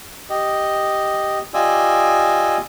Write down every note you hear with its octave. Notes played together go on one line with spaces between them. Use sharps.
G4 D#5
F4 G4 D5 D#5 G#5 E6